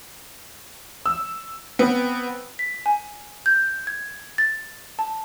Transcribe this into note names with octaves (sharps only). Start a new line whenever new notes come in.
E6
B3 C4
B6
G#5
G6
G#6
A6
A5